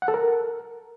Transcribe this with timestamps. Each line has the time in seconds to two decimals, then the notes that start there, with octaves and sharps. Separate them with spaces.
0.02 F#5
0.08 A4
0.14 A#4